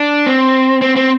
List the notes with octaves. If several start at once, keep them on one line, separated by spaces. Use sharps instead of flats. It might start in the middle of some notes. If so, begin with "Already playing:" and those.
Already playing: D4
C4
C4
C4